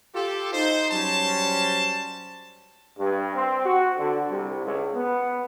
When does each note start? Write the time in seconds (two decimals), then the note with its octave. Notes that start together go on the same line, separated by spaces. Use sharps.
0.14 F4 G4 A4
0.52 D#4 C5
0.91 F#3 G3 C#4 C5 A5
2.98 G2
3.35 C4
3.65 F#4
3.97 D3
4.30 C2
4.63 C#2
4.94 B3